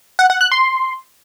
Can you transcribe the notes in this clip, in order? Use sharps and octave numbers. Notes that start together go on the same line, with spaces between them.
F#5
F#5
F#6
C6